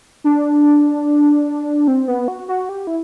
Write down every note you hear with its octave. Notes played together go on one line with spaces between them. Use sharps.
D4
C4
B3
F#4
F#4
G4
E4